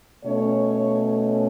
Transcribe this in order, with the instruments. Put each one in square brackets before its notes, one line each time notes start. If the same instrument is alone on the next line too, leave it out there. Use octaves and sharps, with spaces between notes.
[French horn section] B2 A3 C#4 C#5